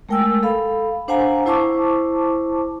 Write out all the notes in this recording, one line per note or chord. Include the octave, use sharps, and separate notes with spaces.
G#3 A3 A#4 G5 G#5 E6
A4 F5 B5
D4 C5 F5 F#5 G#5 A#5
E4 C5 A5 C#6 D6